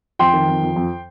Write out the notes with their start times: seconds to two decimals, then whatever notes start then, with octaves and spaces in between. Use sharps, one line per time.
0.19 F2 G5 C6
0.34 D#3
0.49 F2
0.62 F2
0.76 F2